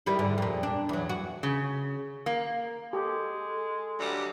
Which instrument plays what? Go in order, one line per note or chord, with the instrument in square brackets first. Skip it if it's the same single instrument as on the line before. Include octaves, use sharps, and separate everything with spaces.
[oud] D#3 G3 E4
G#2 D3
F2 A#2
D4
E2 F#3
F#4
[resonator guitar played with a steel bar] C#3
A#3
[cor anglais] G#3 [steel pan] G4 [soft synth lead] A4
[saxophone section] D2 F#3 G3